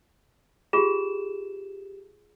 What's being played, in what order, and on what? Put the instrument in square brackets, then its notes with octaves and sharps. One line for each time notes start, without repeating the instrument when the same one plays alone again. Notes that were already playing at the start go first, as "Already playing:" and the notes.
[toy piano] F4 G#4 [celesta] G4 E7